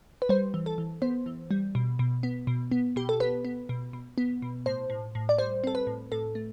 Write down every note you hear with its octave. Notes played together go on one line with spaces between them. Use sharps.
B4
G3 C5
E3
A4
E3
B3 C5
E3
G3
B2
B2
B3
B2
B3
B2 G4
A4
B3 B4
B3
B2
B2
B3
B2
A2 C5
A2
A2
D5
G3 C5
C4 A4
B4
A2
A2 A4
A3